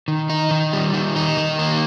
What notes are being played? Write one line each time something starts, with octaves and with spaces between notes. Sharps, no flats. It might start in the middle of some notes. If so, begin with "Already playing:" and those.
D#3
D#4
D#3
G3
D#3
D#4
D#3
A#3